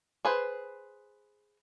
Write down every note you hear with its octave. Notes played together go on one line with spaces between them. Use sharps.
G#4 B4 C5